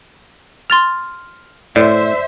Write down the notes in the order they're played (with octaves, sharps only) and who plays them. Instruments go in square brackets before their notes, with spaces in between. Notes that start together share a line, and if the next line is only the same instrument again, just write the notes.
[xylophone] C6 A6 F7 [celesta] F6
[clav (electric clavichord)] A2 [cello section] C5 E5 [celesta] D5